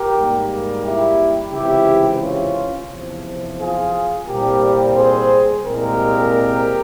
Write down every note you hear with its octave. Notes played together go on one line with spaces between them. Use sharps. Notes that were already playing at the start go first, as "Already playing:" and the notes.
Already playing: G4 A#4
G#2 G3 A#3
E4 G4
C#2 C3 E3 E4 G4
C#4 F4
E2 C3 F3
F4 G#4
C2 A#2 G3 C4 G4 A#4
G#4 C5
C2 A#2 G#3 C4 G4 A#4